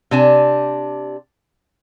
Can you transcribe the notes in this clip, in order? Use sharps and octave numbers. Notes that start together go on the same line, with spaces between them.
C3 D4 G#5